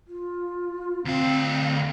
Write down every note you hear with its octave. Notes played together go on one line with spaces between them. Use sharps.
F4
D2 C4 F5